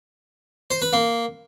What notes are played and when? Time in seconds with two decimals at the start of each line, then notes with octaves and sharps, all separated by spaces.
0.71 C5
0.82 B4
0.93 A#3